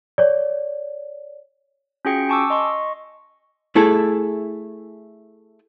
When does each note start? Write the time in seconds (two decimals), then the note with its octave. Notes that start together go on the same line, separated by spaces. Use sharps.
0.18 C#5 D5
2.05 C#4 F4 F#4 G#4 G5 C#7
2.29 G#5 A5 C#6 D6 E6
2.50 D#5 C6 C#6
3.75 A3 E4 G#4 A4